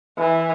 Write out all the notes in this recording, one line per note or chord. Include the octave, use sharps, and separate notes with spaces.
E3